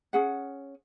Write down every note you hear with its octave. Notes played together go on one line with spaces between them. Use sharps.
C#4 G#4 F#5